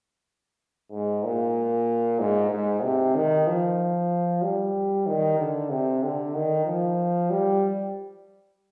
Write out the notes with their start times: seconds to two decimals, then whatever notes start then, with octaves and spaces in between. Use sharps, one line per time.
0.91 G#2
1.24 A#2
2.19 G#2
2.51 G#2
2.83 C3
3.15 D#3
3.47 F3
4.42 G3
5.07 D#3
5.38 D3
5.70 C3
6.03 D3
6.35 D#3
6.66 F3
7.30 G3